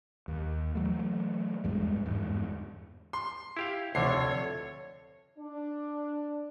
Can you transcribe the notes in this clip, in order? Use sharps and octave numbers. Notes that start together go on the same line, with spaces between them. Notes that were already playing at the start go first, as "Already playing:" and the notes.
D#2
E3 F#3 A3
A1 E2 G2 G#3
G1 E2 G#2
C6
E4 G4 F5
F1 D2 D3 C#5 C7
D4